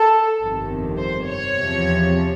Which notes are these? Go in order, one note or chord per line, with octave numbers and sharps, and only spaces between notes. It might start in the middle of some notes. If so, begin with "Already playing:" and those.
Already playing: A4
G1 F2 C3 D#3
C5
C#5
E2 C3 F3